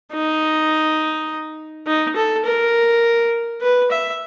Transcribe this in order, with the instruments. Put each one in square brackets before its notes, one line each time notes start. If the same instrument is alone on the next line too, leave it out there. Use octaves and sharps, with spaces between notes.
[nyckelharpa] D#4
D#4
A4
A#4
B4
E5